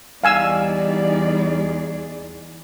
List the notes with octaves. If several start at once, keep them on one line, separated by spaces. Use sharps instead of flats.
E2 G3 D#4 G#4 D5 F5 G#5 E6